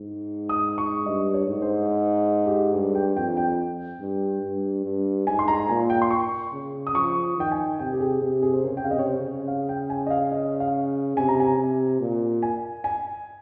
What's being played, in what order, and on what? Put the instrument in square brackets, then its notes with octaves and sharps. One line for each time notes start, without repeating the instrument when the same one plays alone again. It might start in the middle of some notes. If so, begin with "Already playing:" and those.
Already playing: [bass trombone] G#2
[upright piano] D#6
C#6
[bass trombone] G2 [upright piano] D#5
[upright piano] C#5
[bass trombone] G#2
[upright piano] C5
G4
[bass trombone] G2 [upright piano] G#4
[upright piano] G5
[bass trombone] F2 [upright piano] G5
[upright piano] G5
[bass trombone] G2
G2
G2
[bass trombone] G#2 [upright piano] G#5
[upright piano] C6
A#5
[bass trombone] A#2 [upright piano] G#5
[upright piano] G5
C6
C#6
[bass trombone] C#3
[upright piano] D#6
[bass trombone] F3 [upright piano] C#6
[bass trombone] D#3 [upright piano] G5
[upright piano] G#5
[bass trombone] C3 [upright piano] G5
[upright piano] G4
G#4
[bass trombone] C3 [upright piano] G4
[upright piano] G#4
C5
[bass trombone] C#3 [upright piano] A#4
[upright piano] G5
F5
[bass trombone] C3 [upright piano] D#5
[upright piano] C#5
C5
[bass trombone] C#3
[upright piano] F5
G5
G#5
D#5
F5
D#5
F5
[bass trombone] C3 [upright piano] G#5
[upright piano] A#5
G#5
[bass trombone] C3
A#2
[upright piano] G#5
G#5